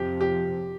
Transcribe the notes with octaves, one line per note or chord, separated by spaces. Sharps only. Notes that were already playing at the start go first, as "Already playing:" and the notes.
Already playing: F2 C3 F3 G4
G4